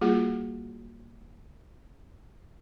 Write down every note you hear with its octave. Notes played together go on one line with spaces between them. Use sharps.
G3 A#3 F4 F#4 G#4